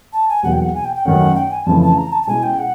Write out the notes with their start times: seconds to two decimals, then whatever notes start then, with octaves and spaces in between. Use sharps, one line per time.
0.13 A5
0.29 G#5
0.43 E2 B2 F#3 A#3 D#4 F#5
0.52 G5
0.61 F#5
0.74 G#5
0.85 G5
0.95 G5
1.05 F#2 D#3 F#3 A3 C#4 F#5
1.35 G5
1.51 G#5
1.66 F2 C#3 E3 A3 A5
1.82 A5
1.97 A#5
2.12 A5
2.23 A5
2.27 B2 G#3 C#4 E4 G#5
2.43 G5
2.59 F#5